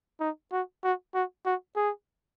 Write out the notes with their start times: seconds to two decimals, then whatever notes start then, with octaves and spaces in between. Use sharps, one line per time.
0.20 D#4
0.52 F#4
0.84 F#4
1.14 F#4
1.45 F#4
1.76 G#4